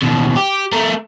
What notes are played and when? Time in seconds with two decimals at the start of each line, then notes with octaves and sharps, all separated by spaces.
0.03 D#2 B2
0.36 G4
0.72 A3 A#4